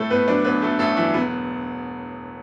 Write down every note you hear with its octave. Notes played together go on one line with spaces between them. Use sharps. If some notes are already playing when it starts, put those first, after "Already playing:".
Already playing: A2 A3 A4
A2 B3 B4
F#3 D4 D5
A1 B3 B4
F#3 A3 A4
A1 A3 A4
E3 F#3 E4
E1 B3